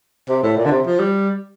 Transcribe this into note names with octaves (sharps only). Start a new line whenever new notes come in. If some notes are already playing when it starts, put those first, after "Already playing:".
C3
A2
A#2
D3
C3
F3
G3